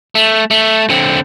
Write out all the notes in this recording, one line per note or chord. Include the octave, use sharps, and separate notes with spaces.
A3
A3
D3 C4